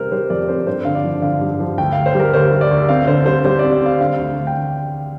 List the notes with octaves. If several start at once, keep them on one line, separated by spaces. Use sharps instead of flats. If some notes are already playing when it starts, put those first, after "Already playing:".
Already playing: C3 G3 C4 A#4 C5
G3 C5
F2 D5
C4 C5
G2 C5
D3 F5
D5
F3
D3 F5
G2
F3
D2 G5
D2 F5
C5
G3 A#4
D2 C5
G3
D5
D2
C4 F5
D3 C5
G3 C5
G3 C5
D5
C4
D5
C4 F5
D3 F5
D2
D2
G5